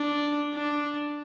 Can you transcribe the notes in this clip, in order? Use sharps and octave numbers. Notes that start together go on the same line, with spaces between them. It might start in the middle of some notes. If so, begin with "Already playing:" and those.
Already playing: D4
D4